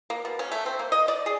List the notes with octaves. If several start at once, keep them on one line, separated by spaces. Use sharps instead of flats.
A#3
B2
C#4
A3
C4
A#3
D#5
D5
G#4